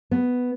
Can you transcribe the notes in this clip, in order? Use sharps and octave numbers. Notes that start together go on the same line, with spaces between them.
B3